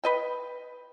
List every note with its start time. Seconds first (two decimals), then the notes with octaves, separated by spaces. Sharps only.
0.04 B4 D#5 G5